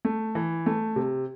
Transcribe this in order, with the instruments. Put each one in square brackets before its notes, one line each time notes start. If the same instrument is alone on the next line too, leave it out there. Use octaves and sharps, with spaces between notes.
[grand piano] A3
E3
A3
C3